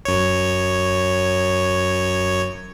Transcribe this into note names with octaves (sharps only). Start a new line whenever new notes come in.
F#2 C#5